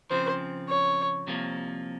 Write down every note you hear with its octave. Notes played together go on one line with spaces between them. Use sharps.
C#3 F3 C4 C5
C#5
C2 C3 F3 A#3